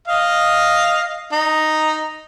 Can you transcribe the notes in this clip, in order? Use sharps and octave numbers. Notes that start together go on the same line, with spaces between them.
D#5 F5
D#4